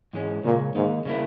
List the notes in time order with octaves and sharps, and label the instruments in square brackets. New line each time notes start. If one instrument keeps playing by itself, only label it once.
[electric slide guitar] G#2 E3 G#3 C#4
[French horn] A#2 [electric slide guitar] C#3 G#3 C#4
[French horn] G#2 [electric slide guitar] D#3 A#3 D#4
[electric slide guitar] C#3 G3 A#3 E4